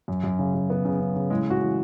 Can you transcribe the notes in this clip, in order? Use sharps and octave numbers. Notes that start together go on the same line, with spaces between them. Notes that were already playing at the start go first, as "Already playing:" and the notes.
F#2
F#2
C#3
F#2
C#3 B3
C#3
C#3
C#3
A2 G#3
A2 F#4
E3